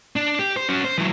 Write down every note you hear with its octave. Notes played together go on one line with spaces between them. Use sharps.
D4
G4
C5
C#4 F#4
C5
E3 F#3